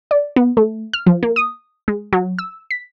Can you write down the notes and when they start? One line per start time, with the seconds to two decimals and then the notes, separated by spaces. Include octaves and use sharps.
0.11 D5
0.36 B3
0.57 A3
0.93 F6
1.06 F3
1.23 A#3
1.36 D#6
1.88 G#3
2.13 F#3
2.39 E6
2.71 B6